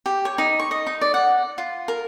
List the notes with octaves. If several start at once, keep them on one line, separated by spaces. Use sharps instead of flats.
G4
C#5
D#4
C#6
D#5
D#4
D5
F#5
F4
A#4